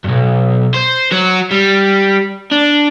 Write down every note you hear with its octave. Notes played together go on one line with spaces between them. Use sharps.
B1 G2
C5
F#3 F#4
G3
D4